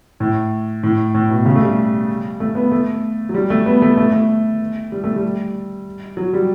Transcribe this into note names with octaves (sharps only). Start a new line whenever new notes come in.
A2
A2
A2
B2
C#3
A3
G3
A3
B3
A3
F#3
G3
A3
B3
A3
A3
A3
G3
A3
G3
F#3
G3